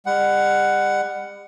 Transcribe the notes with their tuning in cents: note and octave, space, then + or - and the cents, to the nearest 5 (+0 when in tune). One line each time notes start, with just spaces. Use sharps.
G3 +40 F#5 +10